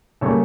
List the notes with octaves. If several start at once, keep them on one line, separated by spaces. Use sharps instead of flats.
C#3 G3 A#3 A4 C#5